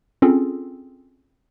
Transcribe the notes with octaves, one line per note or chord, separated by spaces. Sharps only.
C4 C#4 F4 G#4 A4